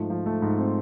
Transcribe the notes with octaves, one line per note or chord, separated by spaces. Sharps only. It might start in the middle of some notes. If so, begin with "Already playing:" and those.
Already playing: G#2 F3 A3
F3
A3
G#2
C4